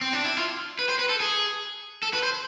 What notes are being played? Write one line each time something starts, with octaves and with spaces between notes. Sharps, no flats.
C4
D4
E4
F4
B4
C5
B4
A4
G#4
A4
B4
C5